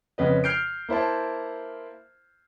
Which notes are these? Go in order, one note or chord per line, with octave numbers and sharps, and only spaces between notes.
F2 C#3 B4 D#5
F6 G6 C7 D7
A#3 E4 C5 A5